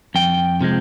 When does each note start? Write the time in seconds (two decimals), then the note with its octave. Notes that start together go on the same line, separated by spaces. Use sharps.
0.15 F2 G5
0.61 C3 F3 G#3